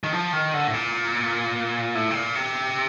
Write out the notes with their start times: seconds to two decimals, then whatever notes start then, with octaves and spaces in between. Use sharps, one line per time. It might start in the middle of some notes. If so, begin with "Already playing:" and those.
0.03 D#3
0.13 F3
0.33 D#3
0.54 D3
0.67 A2
0.74 A#2
1.95 A2
2.11 C3
2.15 A#2
2.35 C3